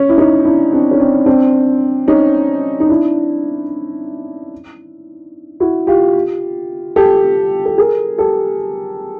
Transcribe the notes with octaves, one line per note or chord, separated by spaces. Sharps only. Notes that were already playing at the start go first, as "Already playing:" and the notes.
Already playing: C#4
E4
C#4 D#4
D4 E4
C4 D4
C#4
C4 D4
C4 D4
C#4 D#4
D#4
D4 E4
E4 F#4
F4 G4
G4 A4
A4
G#4 A#4
G4 A4